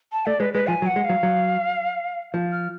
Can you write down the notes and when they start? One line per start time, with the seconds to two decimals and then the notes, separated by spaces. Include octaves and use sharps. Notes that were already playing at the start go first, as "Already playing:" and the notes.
0.12 A5
0.26 A3 D5
0.40 G#3 B4
0.54 G#3 B4
0.67 F3 G#5
0.82 F#3
0.86 F#5
0.96 G#3
1.05 F#3 F5
1.23 F#3
2.34 F3
2.52 F6